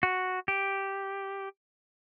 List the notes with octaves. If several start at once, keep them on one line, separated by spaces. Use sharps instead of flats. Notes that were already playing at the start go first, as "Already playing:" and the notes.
F#4
G4